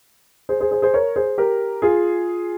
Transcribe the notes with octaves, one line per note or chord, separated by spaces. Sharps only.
G#4 C5
G#4 C5
G#4 C5
G#4 C5
A#4 C#5
G#4 C5
G4 A#4
F4 G#4